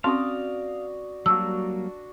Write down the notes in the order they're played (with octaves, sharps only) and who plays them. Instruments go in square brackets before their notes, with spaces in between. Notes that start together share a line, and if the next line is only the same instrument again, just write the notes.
[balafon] C4 C#4 C6 [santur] F#4 D5 D#6 [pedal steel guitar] F5
[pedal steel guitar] F#3 G3 A#3 [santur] D4 F#4 [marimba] E6